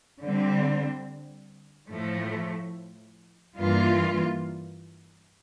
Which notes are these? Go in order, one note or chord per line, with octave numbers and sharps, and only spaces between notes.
D3 G3 C4
A2 F3 A3
G2 E3 A#3 F4